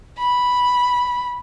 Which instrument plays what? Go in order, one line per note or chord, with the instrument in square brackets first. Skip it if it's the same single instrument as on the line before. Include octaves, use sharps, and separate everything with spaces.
[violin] B5